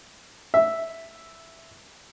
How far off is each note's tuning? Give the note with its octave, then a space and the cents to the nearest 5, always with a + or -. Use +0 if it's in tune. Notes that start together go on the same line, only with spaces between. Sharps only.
E5 +0